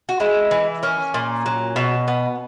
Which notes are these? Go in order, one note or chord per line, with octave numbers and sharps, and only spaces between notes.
F#4
G#3 E4
E3
A#3 C#4
A#2
F#3
B2
B3